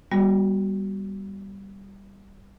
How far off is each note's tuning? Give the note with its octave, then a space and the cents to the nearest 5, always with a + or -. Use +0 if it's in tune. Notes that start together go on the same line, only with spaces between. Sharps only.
G3 +0 B3 -40 F#4 +15